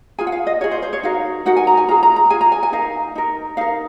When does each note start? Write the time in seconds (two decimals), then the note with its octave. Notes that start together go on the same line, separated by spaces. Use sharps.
0.18 F4 G#4 G#5
0.27 F#5
0.32 F5
0.47 D#5
0.61 F4 G#4 C#5
0.71 C5
0.82 C5
0.93 C#5
1.03 D#4 F#4 A#4 F5
1.46 D#4 F#4 A#4 F#5
1.57 G#5
1.67 A#5
1.77 G#5
1.88 F4 G#4 A#5
2.03 A#5
2.16 A#5
2.30 F4 G#4 G#5
2.41 A#5
2.52 G#5
2.63 G#5
2.72 D#4 A#4 F5
3.15 D#4 A#4
3.57 D#4 A#4 F5